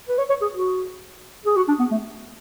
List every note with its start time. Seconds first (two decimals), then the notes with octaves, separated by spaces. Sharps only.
0.08 B4
0.18 C#5
0.29 C#5
0.41 G#4
0.53 F#4
1.46 G#4
1.56 F#4
1.68 D4
1.79 B3
1.91 A3